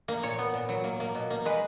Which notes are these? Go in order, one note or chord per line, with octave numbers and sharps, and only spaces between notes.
A#3
A#2 C#5
B3
A#2
F#3
A#3
A#3
B2
A#3
G#3 B4